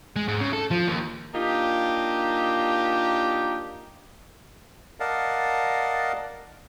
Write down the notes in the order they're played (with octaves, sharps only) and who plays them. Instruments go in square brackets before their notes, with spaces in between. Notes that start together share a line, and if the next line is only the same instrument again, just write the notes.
[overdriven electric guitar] G#3
G#2
C#3
A4
F3
D#2
[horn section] A#3 D4 D#4 F4 G4
[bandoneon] A#4 D5 D#5 F5 F#5 A5